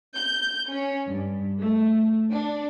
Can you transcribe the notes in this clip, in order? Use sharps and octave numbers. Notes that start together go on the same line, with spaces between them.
G6
C#4
G2
A3
D4